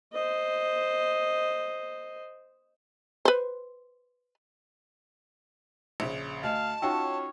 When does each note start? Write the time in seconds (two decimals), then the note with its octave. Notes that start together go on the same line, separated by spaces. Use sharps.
0.13 C5 D#5
3.25 B4 C5
6.00 A#1 C#3
6.43 D2 D#5 F5 A5
6.82 C#4 D#4 F4 F#4 C#5 G5 E6